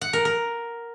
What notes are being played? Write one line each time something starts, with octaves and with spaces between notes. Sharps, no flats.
F#5
A#4
A#4